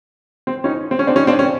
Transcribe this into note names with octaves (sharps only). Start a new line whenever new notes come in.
C4
C#4 D#4
C4
C#4
C4 D4
C#4 D#4
C4 D4
C#4